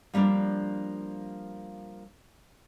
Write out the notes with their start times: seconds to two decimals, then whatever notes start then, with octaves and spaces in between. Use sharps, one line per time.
0.14 F3 G3 A#3 D4